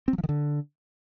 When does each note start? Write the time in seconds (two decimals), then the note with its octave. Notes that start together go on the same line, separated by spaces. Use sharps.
0.08 C4
0.13 F#3
0.18 F3
0.24 D#3
0.29 D3